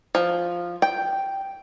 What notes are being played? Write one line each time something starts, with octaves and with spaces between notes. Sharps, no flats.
F3
G5